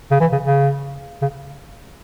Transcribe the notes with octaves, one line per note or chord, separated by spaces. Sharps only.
C#3
E3
C#3
C#3
C#3